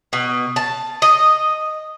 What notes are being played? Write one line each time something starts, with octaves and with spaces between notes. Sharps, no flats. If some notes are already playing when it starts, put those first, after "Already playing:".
B2
A5
D#5